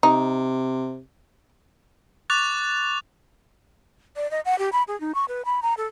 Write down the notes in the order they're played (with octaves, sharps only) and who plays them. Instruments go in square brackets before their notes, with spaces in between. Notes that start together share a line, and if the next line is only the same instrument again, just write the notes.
[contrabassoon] C3 [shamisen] D#4
[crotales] C#6 D6 F#6 A6 F7
[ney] D5
D#5
F#5
G4
B5
G#4
D#4
C#6
B4
B5
A#5
A4